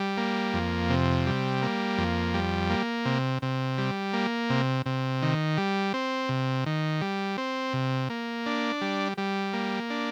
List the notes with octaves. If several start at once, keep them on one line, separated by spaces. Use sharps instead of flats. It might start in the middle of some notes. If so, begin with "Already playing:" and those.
Already playing: G3
A#3
F2
C3
G3
A#3
F2
G3
A#3
C3
C3
G3
A#3
C3
C3
D#3
G3
C4
C3
D#3
G3
C4
C3
A#3
D4
G3
G3
A#3
D4